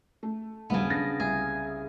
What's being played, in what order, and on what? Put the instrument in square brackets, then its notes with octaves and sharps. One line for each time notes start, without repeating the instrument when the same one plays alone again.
[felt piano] A3
[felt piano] D#1 B1 G2 [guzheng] C#3 B3
[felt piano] D4 A6 A#6
[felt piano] C2 [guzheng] G#4